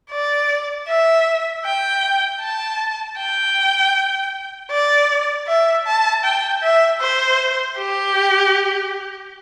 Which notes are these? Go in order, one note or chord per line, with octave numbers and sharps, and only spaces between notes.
D5
E5
G5
A5
G5
D5
E5
A5
G5
E5
C5
G4